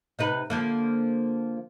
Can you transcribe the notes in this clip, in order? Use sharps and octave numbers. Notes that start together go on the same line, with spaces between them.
C3 D#4 B4
D3 F3 A#3